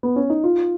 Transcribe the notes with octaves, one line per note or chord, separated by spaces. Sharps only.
B3
C#4
D#4
F4